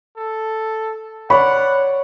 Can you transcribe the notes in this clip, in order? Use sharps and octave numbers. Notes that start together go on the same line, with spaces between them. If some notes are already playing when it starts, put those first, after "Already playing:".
A4
C#5 D5 F#5 B5